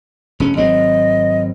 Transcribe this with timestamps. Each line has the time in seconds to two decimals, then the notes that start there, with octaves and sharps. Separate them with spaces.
0.40 F1 C#4
0.57 G#1 F#3 C4 D#5